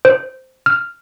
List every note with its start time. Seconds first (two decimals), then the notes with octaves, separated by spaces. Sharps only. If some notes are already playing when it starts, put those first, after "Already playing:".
0.05 C5
0.66 F6